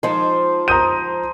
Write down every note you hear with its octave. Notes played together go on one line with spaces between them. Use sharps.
F3 G#3 D#4 C5 A5
A#5 C6 D#6 G6 D#7